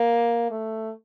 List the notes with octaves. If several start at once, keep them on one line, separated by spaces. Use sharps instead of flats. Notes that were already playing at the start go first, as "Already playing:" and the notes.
Already playing: A#3
A3